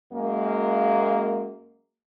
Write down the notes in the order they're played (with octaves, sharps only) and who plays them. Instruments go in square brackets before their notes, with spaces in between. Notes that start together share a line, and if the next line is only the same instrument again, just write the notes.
[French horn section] F#2 G#3 A#3